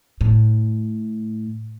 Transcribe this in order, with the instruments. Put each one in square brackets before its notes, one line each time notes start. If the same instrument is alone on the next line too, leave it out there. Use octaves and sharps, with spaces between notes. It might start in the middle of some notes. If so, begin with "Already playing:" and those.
[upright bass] A2